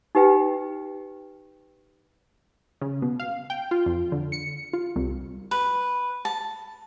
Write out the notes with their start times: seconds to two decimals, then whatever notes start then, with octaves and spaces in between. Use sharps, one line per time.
0.15 D#4 G4 B4 G5
2.81 C#3
3.02 B2
3.19 F5
3.50 G5
3.71 F4
3.86 F2
4.12 D3
4.32 C#7
4.73 F4
4.96 C2
5.51 B4
6.25 A5